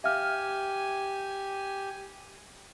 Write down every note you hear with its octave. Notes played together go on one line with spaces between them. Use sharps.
G4 E5 F5 G#5 F6